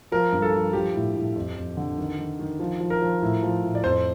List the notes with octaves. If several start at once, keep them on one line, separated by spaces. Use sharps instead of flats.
F3 A#4
G2
A4
F3
F3 G4
A2
A2
F2
F2
D3
D#3
D#3
D#3
F3
F3
A#4
F3
A2
F3
A2
D5
F2 C5